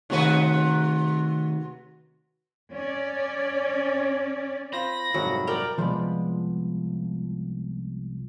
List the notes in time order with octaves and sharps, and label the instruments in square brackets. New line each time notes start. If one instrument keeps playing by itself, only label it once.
[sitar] C3 F#4 B4 [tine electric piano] D#3 A3 D#4
[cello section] C#4 D5
[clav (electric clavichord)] C4 F4 [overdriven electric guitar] B5 [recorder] A#6
[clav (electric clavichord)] C2 F2 G#2 [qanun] F#3
[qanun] A#4 G5 A#5 [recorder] D5
[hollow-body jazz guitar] C2 F3 G#3 B3 D5 B5